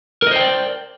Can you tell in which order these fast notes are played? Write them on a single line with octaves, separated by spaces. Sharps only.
A#4 D#5 C5 G5 D5